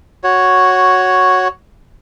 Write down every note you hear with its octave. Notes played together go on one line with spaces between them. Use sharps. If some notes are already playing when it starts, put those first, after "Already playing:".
F#4 C#5